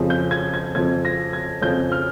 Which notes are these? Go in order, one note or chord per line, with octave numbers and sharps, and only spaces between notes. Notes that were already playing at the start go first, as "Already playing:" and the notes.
Already playing: F2 C#3 F3
G6
G#6
G#6
F2 C#3 F3 G#6
A#6
G#6
F2 C#3 F3 G6
F6